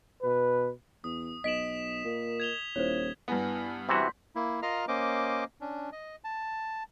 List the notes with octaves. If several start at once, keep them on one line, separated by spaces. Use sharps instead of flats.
B2 B4
E2 D#6
B1 D#5 B6 D7 E7 F#7
A#2 A#4
G#6 F7 G7
D#1 E4 C5 C#5
G2 B3 E4 G#5 A#6
C3 E3 F#4 C6 G6 B6
A#3 E4
F4 A#4 D#5 F5 A#5 F6
A#3 C#4 C5 D#5 D6
C#4 D4
D#5
A5